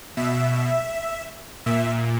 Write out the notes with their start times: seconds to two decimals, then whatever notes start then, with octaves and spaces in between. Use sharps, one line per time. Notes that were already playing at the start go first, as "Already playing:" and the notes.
0.17 B2 E5
1.66 A#2 E5